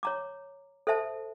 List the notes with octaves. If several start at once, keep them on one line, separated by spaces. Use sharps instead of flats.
C#5 A#5 D6
A4 C5 E5 A5